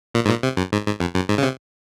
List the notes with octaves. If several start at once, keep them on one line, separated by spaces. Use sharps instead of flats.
A#2
G#2
A#2
C3
F#2
G#2
G#2
F2
F#2
G#2
C#3
C3